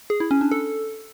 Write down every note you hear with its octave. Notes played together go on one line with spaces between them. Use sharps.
G#4
E4
C#4
D4
A4